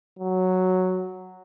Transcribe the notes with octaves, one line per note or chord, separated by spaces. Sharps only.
F#3